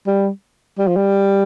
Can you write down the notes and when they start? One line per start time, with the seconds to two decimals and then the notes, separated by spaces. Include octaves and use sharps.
0.07 G3
0.78 G3
0.87 F3
0.96 G3